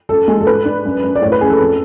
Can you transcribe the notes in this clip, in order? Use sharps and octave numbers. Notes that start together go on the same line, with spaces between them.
F#2 A4
G#3
A4
G#2 B4
D4
F#2
F#2
D5
A2 C#5
B4
C#4 G#4
A4
F2